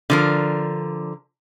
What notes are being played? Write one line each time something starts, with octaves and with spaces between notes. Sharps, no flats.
D3 F3 A#4